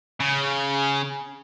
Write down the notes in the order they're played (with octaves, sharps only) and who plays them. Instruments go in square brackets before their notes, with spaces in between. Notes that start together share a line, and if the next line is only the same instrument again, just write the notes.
[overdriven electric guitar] C#3